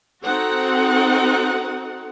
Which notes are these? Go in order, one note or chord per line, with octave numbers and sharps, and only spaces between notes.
C4 D#4 F#4 A4 F#5